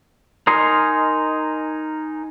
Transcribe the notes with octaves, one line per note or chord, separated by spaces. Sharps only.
D#4 A#4 D#5 G#5 C6